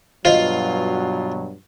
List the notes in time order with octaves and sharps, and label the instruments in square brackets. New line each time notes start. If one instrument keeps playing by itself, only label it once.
[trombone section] G2 B2 F#3 [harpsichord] F4 [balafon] C5 D#5